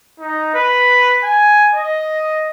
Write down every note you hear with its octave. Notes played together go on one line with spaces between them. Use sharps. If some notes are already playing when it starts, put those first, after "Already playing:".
D#4
B4
G#5
D#5